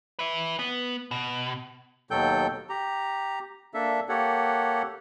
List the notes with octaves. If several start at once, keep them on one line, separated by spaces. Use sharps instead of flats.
B4 E5
B3
B2
D#2 B2 F#3 A4 G5 G6
G4 A#5
A#3 D4 A4 E5
A#3 G4 A4 C#5 F#5